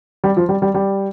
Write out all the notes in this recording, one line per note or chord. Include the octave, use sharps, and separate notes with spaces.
G3
F3
G3
G3
G3